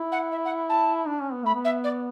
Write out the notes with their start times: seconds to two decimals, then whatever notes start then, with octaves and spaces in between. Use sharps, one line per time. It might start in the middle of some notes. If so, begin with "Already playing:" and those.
Already playing: E4
0.12 F#5
0.31 E5
0.45 F#5
0.69 A5
1.08 D4
1.21 C#4
1.33 B3
1.44 A3 B5
1.55 B3
1.64 E5
1.84 D5